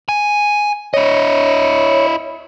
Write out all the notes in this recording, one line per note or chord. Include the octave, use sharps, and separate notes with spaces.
G#5
E4 C#5 D#5